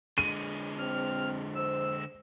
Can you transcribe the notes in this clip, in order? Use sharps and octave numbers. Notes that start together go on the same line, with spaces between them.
D3 G#3 D#7
C4 F6
C5 E6